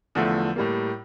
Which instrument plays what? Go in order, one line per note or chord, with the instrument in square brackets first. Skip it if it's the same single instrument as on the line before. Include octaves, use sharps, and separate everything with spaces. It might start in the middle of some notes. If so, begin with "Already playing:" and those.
[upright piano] E2 D3 F3 A3
A2 G3 A#3